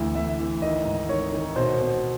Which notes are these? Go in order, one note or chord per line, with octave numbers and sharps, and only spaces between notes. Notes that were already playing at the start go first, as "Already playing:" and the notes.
Already playing: D2 E3
D2 E5
E3
D#3 D#5
G#2
D#3 C#5
D#3
B2 C5
B2